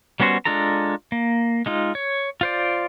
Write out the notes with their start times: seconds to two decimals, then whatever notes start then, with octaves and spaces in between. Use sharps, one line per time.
0.20 G3 B3 C#4 F#4 C5
0.45 G#3 D4 F4 A4 A#5
1.12 A#3
1.66 G#3 D#4 F4
1.95 C#5
2.41 F4 C5 D5